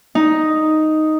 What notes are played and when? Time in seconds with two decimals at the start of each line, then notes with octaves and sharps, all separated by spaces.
0.15 D#4